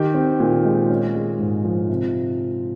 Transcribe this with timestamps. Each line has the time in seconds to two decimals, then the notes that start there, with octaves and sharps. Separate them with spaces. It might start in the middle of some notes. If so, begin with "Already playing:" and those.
Already playing: D#3 G4
0.14 C4
0.40 A#2
0.64 G#3
0.90 C#4
1.15 G#3
1.39 G#2
1.64 F3
1.89 C3